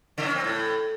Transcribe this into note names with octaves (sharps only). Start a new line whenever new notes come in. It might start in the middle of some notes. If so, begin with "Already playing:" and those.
C#3
C#4
C4
A2